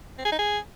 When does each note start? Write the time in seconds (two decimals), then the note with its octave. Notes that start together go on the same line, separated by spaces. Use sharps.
0.18 C4
0.25 G#4
0.32 D#4
0.39 G#4